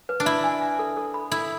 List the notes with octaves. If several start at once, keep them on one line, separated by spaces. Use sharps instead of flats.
B4
D4
E4 E5
G#5
E5
A4
A4
B5
E4 A4